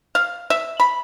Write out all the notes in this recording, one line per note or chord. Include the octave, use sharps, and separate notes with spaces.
F5
E5
B5